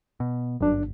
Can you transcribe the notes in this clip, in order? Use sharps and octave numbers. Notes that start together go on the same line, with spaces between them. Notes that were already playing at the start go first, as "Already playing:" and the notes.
B2
G1 F#2 D4